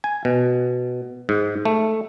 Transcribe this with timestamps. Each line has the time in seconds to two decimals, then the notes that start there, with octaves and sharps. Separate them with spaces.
0.04 G#5
0.25 B2
1.29 G#2
1.65 A3